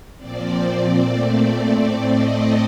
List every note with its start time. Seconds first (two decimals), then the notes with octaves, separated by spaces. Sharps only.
0.18 A#2 F3 C4 D5
0.96 A#2 A3 C4
1.74 A2 A3 C4 D5
2.13 D#5